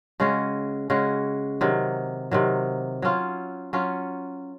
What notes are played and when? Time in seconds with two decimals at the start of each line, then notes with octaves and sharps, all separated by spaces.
0.20 C#3 G#3 C#4 F#4
0.90 C#3 G#3 C#4 F#4
1.61 C3 D#3 F#3
2.31 C3 D#3 F#3
3.02 F#3 C#4 F4
3.73 F#3 C#4 F4